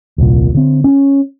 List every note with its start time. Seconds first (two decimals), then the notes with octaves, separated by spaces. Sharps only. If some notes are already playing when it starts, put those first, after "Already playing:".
0.18 D#1 C2 A#2
0.55 D3 C4
0.84 C#4